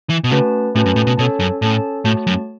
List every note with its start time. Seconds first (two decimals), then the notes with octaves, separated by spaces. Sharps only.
0.10 E3
0.24 B2
0.31 C#3 A3 C#4 F#4 B4 A5
0.75 A2 A3 C#4 F#4 B4 A5
0.86 F#2
0.96 A2
1.07 B2
1.18 B2 C#4 A4 C#5 A5
1.40 F#2
1.62 A2 C#4 A4 C#5 A5
2.05 A2 A3 F#4 C#5 A5
2.27 F#2